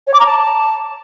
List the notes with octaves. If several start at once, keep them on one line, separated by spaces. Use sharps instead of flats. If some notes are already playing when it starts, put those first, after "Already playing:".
C#5
D6
A#5
A5